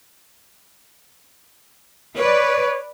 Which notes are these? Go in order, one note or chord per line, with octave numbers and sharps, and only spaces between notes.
B4 C#5 D5